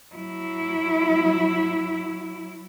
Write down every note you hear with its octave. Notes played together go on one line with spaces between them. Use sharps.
F#3 E4